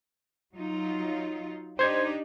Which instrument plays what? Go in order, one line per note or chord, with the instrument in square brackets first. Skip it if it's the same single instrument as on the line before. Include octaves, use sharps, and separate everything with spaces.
[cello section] F#3 D#4 F4
[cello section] D4 D#4 G4 [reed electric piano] C5 G#6